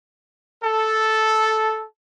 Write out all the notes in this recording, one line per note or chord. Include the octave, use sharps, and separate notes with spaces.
A4